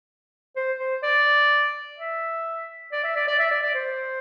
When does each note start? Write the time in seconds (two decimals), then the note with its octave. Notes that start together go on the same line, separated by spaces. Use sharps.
0.56 C5
0.80 C5
1.03 D5
1.98 E5
2.92 D5
3.04 E5
3.16 D5
3.27 D5
3.39 E5
3.51 D5
3.63 D5
3.75 C5